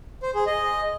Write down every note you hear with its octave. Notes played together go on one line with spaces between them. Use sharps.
C5
G#4
D#5